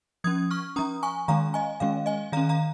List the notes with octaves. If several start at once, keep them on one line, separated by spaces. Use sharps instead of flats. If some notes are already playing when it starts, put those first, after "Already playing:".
F3 C#4 D#6 G#6
C#6 F6
F3 C#4 A#5 D#6
G#5 C#6
D#3 G#3 C#4 F5 A#5
D#5 G#5
D#3 G#3 C#4 F5
D#5 G#5
D#3 C#4 F5 A#5
F5 A#5